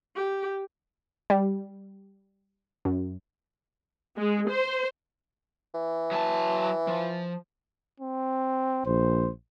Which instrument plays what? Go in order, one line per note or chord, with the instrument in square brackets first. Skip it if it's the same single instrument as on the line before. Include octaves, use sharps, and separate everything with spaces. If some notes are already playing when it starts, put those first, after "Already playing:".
[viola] G4
[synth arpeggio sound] G3
F#2
[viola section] G#3
C5
[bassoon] E3
[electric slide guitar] F#3 G#5 A5
F3
[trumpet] C4
[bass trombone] A#1 [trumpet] C5